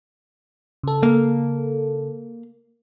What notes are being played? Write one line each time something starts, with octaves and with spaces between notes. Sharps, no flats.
C#3 A4
A#3